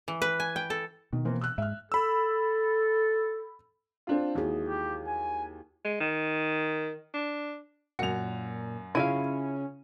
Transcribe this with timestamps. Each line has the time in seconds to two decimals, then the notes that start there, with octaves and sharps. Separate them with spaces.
0.08 E3
0.22 B4
0.40 G#5
0.56 G5
0.70 A4
1.13 B2 D#3
1.25 E3 A#3 C4
1.41 E6 F#6
1.58 G#2 E5 F6
1.92 A4 B5 E6
4.07 C4 D4 F4
4.35 D#2 E4 F#4 G#4
4.68 G4
5.07 G#5
5.85 G#3
6.00 D#3
7.14 D4
7.99 F#2 A#2 F#4 C#7 F7
8.95 C#3 C#4 E4 F4 E5 F5 D#7